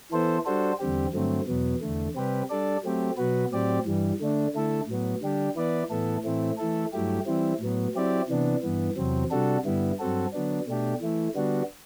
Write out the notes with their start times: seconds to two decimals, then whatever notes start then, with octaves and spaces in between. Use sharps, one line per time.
0.11 E3 B3 E4 A4 C5
0.45 G3 D4 F#4 A4 C5
0.79 E2 D3 G3 C4 G4
1.14 G2 D3 F#3 A3 C4
1.47 E2 B2 F#3 B3
1.81 E2 D3 A3
2.15 C3 G3 C4 G4 B4
2.50 G3 D4 A4 D5
2.83 F#3 A3 C4 G4
3.17 B2 F#3 B3 F#4 B4
3.52 A2 F#3 C4 G4 D5
3.86 G2 E3 G3
4.21 D3 A3 D4
4.54 D3 A3 E4 A4
4.87 A2 F#3 B3
5.22 D3 G3 D4 G4
5.56 E3 B3 E4 B4 D5
5.90 A2 E3 B3 E4 A4
6.24 A2 E3 A3 C4 E4
6.58 E3 A3 E4 A4
6.93 G2 F#3 A3 E4 G4
7.26 E3 G3 C4 E4
7.60 A2 F#3 B3
7.94 F#3 C4 E4 G4 D5
8.28 C3 E3 B3 D4
8.63 G2 E3 B3
8.97 E2 C3 F#3 C4
9.31 C3 G3 D4 F#4 A4
9.65 G2 D3 G3 B3 E4
9.99 G2 F#3 C4 F#4 A4
10.33 D3 F#3 B3 D4
10.67 B2 A3 D4 G4
11.01 E3 A3 E4
11.35 D3 G3 B3 D4 F#4